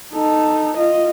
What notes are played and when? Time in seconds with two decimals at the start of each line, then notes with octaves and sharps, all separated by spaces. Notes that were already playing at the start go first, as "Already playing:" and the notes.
0.13 D#4 A4
0.78 F4 D#5